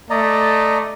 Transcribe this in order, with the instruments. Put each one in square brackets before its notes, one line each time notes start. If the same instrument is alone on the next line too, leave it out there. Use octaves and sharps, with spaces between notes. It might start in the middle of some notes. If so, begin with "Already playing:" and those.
[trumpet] A3 [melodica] D5 D#5 A#5